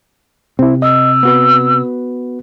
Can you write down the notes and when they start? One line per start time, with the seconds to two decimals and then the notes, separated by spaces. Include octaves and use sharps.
0.59 C3 C4 E4
0.82 D#5 E6
1.23 B3 F#4 B4